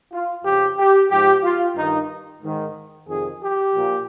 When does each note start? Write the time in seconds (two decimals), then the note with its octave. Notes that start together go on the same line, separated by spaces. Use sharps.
0.12 F4
0.44 F2 C#3 F3 G4
0.77 G4
1.09 G#2 F3 G4
1.43 F4
1.75 G2 D#3 D#4
2.42 G#2 D#3
3.07 F2 C3 D#3 G#4
3.40 G4
3.73 A#2 F3